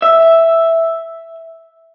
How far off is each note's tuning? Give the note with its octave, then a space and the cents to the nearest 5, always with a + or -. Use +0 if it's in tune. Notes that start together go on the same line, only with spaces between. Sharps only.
E5 +0